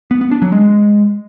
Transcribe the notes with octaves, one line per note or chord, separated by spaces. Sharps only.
B3
B3
D4
F#3
G#3